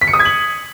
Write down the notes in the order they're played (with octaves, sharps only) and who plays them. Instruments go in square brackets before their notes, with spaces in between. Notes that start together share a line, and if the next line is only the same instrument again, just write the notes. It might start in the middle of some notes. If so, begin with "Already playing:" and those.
[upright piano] B6
C#7
D#6
G#6
F#7